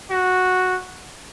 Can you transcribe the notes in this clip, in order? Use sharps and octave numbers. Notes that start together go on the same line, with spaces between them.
F#4